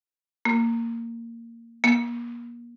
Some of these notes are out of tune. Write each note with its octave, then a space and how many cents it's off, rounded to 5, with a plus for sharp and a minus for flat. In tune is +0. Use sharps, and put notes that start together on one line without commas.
A#3 -15
A#3 +35